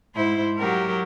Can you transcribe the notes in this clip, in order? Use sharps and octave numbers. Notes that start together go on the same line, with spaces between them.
G#2 E4 C5
F#3 G4 A#4